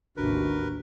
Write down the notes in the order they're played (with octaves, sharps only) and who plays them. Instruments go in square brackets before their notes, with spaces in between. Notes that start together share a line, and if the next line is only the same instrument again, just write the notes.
[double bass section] A1 D#2 C3 [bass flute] D4 [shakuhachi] F#4 [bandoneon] A#4 B4